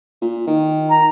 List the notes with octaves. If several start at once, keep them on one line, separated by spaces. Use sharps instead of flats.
A#2
D#3
A#5